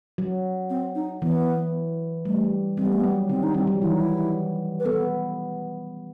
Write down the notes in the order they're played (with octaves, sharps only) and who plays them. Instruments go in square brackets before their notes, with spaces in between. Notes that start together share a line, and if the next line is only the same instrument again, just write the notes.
[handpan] F#3
[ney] C4
D#4
[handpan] E3 [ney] B3
[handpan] G3 [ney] A3
[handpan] G3 [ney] C4
[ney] B3
A3
[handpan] F#3 [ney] B3
[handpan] D#3 [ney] C4
[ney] D#4
[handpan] G3 [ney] C4
[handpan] F#3
[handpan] E3 [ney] E4
[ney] D#4
E4
B4
[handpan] B3 [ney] A4